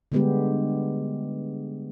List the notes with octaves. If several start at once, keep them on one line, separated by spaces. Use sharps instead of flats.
D3 G3 G#3 B3 D4 G4